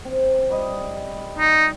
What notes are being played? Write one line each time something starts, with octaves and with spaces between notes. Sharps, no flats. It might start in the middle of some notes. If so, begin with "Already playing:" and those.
C4
G3 D#5
D#4